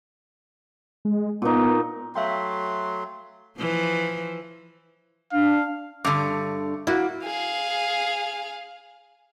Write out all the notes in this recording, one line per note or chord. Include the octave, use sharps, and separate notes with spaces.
G#3
A#2 B3 D#4
F#3 A3 E5 F5 G5 C6
E3 F3
D4 F5
G2 D3 A3 D6
A#3 E4 F#4
G#4 F5